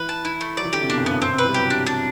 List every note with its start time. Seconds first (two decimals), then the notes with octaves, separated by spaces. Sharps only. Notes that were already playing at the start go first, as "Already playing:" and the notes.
Already playing: E3 B4
0.09 A5
0.25 E4
0.41 A3
0.57 F#3 D5
0.65 E3
0.73 D3 G4
0.81 C3
0.89 B2 D4
0.97 F#2
1.06 G2 B3
1.14 F#2
1.22 B2 C4
1.33 C3
1.38 B4
1.44 E3
1.48 G3
1.54 F#3 G4
1.70 D4
1.86 D4